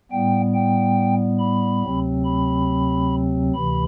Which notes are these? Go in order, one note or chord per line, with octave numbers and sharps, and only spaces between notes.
A2 G3 B3 G5
G5
B5
D2 C3 F#3 C4
B5
D2 C3 E3 B5